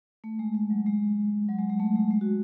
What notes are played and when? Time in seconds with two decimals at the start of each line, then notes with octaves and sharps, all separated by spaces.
0.24 A3
0.39 G#3
0.55 G#3
0.70 F#3
0.86 G#3
1.49 F#3
1.59 G#3
1.69 G#3
1.80 A3
1.95 G#3
2.11 G#3
2.21 F#4